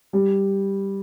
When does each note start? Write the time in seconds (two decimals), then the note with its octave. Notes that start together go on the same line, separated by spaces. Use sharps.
0.13 G3